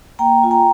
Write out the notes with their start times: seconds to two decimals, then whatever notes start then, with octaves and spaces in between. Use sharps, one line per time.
0.19 A#3 G5 A#5
0.43 F4 G#5
0.51 G5 A#5